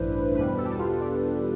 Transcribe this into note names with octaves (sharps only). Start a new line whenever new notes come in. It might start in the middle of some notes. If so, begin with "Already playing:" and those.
Already playing: A1 G2 E3 D4 E4 B4 C5
E2 B2 G3 B4
A4
G4
A4
F4
D4